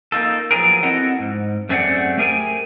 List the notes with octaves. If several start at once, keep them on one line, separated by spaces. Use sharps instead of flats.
A#3 D#4 F4 A4
F3 F#3 B3 C#4 G#4 A#4
C4 E4 F#4 A4 D#5 F#5
G#2
F#2 A3 C4 G#4 D5 F#5
A3 G4 G#4 A#4 G5 G#5